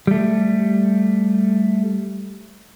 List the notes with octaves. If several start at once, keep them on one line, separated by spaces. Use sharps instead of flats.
G3 A3